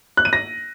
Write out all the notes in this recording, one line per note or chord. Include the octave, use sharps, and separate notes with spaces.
F#6
D#7
A#6